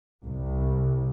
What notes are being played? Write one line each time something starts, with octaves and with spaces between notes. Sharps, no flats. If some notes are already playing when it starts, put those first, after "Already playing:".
C2